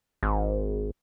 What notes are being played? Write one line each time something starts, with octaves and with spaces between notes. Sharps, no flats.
G#1